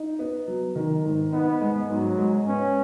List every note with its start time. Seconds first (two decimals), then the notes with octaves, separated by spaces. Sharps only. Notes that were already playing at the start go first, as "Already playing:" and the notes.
Already playing: D#4
0.19 B3
0.47 F#3
0.75 D#3
1.05 G#2
1.33 B3 D#4
1.61 G#3
1.90 G#2 F#3
2.18 G#3
2.48 B3 C#4